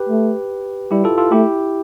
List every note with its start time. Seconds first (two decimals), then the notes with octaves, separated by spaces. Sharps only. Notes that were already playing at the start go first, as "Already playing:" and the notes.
Already playing: G4 B4
0.09 A3
0.91 G3 E4 G4
1.04 F4 A4
1.18 F4 A4
1.32 A3 E4 G4